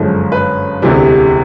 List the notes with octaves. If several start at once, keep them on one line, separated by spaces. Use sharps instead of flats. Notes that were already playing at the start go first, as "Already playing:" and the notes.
Already playing: G1 F#2 D3 F3 G#3
B4
E1 D2 C3 E3 G3